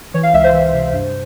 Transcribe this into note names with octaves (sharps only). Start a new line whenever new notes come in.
E3 C#5
F5
C#2 E5
C5
E3
C3
G2